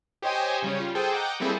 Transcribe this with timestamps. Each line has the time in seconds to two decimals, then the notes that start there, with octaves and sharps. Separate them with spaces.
0.22 G4 C5 C#5 D#5 G5 G#5
0.62 C#3 G3 C#4 C#5
0.77 G3 F4
0.95 G#4 A4 C5 G5
1.12 D#5 F#5 G5 A#5 D6
1.40 G3 A#3 C4 E4 G#4 A4